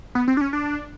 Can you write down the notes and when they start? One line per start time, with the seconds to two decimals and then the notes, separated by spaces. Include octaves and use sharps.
0.15 B3
0.28 C4
0.37 D4
0.41 C#4
0.53 D4